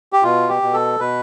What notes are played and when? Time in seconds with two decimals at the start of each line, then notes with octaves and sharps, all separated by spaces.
0.13 G4
0.23 B2 F4
0.49 G4
0.62 B2
0.74 A4
1.00 B2 B4